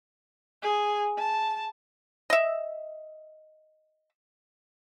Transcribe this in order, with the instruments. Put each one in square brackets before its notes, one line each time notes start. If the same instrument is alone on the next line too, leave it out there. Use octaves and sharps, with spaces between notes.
[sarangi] G#4
A5
[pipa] D#5 E5